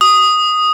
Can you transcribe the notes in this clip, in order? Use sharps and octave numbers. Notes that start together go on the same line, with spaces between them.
D#6